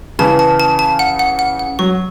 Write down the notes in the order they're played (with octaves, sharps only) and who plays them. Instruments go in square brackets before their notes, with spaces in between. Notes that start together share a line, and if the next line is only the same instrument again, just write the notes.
[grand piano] C#3 E3 [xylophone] A5
[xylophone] A5
A5
A5
F#5
F#5
F#5
F#5
[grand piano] F#3 [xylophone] C#6